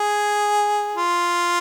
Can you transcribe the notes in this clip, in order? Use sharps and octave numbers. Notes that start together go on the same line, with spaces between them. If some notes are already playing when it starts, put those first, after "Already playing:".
Already playing: G#4
F4